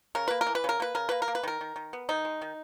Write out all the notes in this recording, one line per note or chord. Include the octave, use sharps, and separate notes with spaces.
C#3 A#4
A#3 B4
A#4
E3
B4
C#3 A#4
A#3 B4
C#3 A#4
A#3 B4
A#4
A#3
B4
D#3 A#4
D#3
D#3
B3
D#3 D#4
G#3
D#3